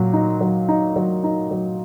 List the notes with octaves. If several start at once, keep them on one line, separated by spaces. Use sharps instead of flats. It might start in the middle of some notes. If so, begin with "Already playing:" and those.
Already playing: A#2 F#3
D#4
F#3
D#4
F#3
D#4
F#3